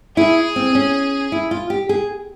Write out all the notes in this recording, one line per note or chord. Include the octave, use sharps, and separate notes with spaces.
E4 G#4
C4
C#4
E4
F4
G4
G#4